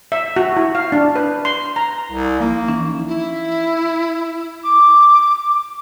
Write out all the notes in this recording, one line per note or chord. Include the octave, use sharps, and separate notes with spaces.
E5
F#4
E4
F5
D4
B4
C6
A#5
C2
F3 A#3 D#4 E4
E3 C#4 D#4
E4
D6